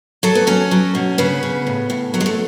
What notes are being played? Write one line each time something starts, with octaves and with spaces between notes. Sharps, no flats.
F#3 A4
B3
F#3 C#4
F#3
B2
C#3 B3
C#3
A2
A2
F#3 A3
G#3
A3